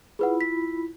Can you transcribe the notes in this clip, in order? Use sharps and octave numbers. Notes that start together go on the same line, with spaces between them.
E4 F4 G#4 B4 F#5 B5
B6